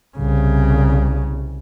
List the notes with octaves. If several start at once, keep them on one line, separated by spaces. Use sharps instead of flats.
C2 C#3